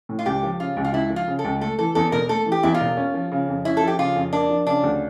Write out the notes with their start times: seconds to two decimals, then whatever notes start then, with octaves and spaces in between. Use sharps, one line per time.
0.09 A2
0.19 F4
0.26 C#2 G4
0.43 F3
0.60 C#3 F4
0.77 C#2
0.85 F4
0.94 C#2 E4
1.10 F3
1.16 F4
1.28 C#3
1.39 A4
1.44 C#2
1.61 A3 A4
1.79 E3 A4
1.95 E2 A4
2.12 E1 A#4
2.29 A3 A4
2.46 E3
2.52 G4
2.63 E2 E4
2.74 F4
2.81 E1
2.97 C#4
3.14 F3
3.32 C#3
3.48 F2
3.65 C#4 E4
3.77 F3 A4
3.88 G4
3.99 C#3 F4
4.16 F2
4.33 A#3 D4
4.50 F3
4.66 C#3 D4
4.83 D2